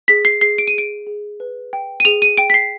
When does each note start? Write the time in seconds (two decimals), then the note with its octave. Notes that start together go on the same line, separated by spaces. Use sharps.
0.08 G#4 B6
0.25 C7
0.41 G#4 C7
0.58 D7
0.67 D#7
0.74 G#4 D7
1.07 G#4
1.40 B4
1.73 G5
2.00 D#7
2.05 G#4 F7
2.22 D#7
2.37 G5 D7
2.50 B6
2.54 C7